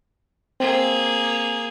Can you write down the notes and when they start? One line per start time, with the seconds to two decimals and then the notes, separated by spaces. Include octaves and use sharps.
0.60 A#3 C4 G#4